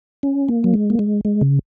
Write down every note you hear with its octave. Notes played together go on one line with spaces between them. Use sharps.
C#4
A#3
F#3
G#3
A#3
G#3
G#3
C#3